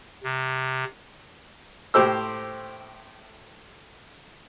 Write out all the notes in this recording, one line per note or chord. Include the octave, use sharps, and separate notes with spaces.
C3
A2 G4 C5 E6